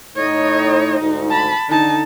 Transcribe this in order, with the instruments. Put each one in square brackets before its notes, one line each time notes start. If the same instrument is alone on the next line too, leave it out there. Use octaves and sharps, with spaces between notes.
[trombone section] A2 D#4 [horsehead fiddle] C#5 D#5
[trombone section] D2 G#2 [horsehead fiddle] D#4
[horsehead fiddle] A5 B5
[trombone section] D3 [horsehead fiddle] D#4 A5